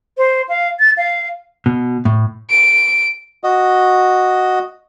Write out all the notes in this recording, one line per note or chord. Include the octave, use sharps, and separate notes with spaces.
C5
F5
A6
F5
B2
A2
D7
F#4 D#5